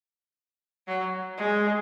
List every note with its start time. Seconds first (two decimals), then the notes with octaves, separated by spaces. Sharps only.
0.87 F#3
1.38 G#3